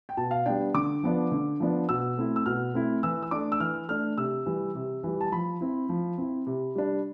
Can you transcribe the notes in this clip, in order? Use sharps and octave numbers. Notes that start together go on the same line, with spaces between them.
G5
B2 A5
F5
G3 B3 D4 G5
D3 D6
F3 B3 D4
D3
F3 B3 D4
B2 E6
A3 C4 E4
E6
B2 F6
A3 C4 E4
E3 E6
E6
A3 D4 D6
E6
E3 F6
A3 D4 F6
C3 E6
E3 G3
C3
E3 G3
A5
F3 B5
C4 E4
F3
C4 E4
C3
G3 D4